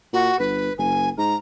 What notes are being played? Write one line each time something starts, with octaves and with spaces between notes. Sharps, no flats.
A#2 F#4
G1 B4
F#1 G#5
G#2 A#5